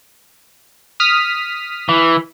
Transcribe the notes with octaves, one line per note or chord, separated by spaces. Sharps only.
D#6 F6 B6
E3